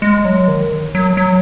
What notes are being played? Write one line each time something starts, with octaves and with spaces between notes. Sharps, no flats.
G#3
F#3
D#3
F#3
F#3